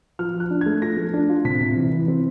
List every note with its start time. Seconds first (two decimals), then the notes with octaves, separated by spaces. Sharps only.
0.19 F3 F6
0.35 F4
0.40 F#6
0.51 D4
0.61 G#6
0.66 A3
0.82 F3 A#6
0.97 A3
1.14 D4
1.29 F4
1.45 C3 B6
1.60 C3
1.76 E3
1.92 E3
2.08 C4